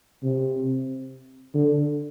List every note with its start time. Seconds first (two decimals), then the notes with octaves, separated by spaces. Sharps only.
0.23 C3
1.54 D3